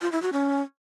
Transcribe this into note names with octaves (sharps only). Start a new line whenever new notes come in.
F4
E4
F#4
C#4